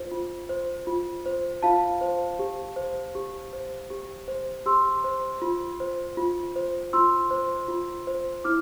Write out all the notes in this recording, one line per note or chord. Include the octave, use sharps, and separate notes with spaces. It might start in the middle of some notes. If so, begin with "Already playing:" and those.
Already playing: F4 C5
F4
C5
F4
C5
F4 F5 A5
C5
G4
C5
G4
C5
G4
C5
G4 C6 E6
C5
F4
C5
F4
C5
F4 C6 E6
C5
F4
C5
E4 D6 F6